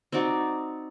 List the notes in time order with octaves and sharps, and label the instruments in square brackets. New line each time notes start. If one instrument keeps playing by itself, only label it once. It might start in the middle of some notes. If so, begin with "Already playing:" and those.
[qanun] C4 D#4 F#4 D5